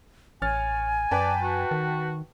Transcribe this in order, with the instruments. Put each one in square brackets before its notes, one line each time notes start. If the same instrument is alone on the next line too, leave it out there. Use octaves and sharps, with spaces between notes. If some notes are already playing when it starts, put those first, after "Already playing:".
[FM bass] A1 [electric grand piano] C#5 F6 A6 [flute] G#5
[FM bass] F#2 [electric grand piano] B4 G5 A5 [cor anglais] D5
[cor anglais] F#4
[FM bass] D#3